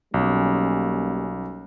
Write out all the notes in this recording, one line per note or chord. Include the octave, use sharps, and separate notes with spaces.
B1 G3 A#3 C#4